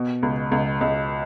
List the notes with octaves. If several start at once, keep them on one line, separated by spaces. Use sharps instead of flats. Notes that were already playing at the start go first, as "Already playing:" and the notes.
Already playing: B2
C#2
C#2
C#2